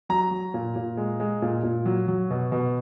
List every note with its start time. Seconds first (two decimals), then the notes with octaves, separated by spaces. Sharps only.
0.09 F#3 A#5
0.31 F#3
0.54 A#2
0.76 A#2
0.97 G#3
1.20 G#3
1.42 A#2
1.63 A#2
1.86 F#3
2.08 F#3
2.31 B2
2.52 B2